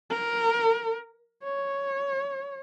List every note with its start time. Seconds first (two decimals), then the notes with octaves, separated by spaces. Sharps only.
0.10 A#4
1.44 C#5